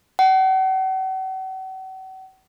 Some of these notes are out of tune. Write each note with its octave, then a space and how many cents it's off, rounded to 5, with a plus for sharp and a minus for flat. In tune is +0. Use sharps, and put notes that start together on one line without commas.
F#5 +40